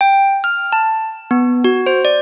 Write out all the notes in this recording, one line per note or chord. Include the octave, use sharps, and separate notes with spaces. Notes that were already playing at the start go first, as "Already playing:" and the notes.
G5
F6
A5
B3
F#4
C5
D5